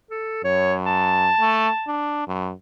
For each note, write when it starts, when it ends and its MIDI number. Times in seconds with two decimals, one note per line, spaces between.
0.11 0.43 69
0.44 1.30 42
0.44 0.74 73
0.86 1.91 81
1.40 1.68 57
1.87 2.23 62
2.28 2.52 42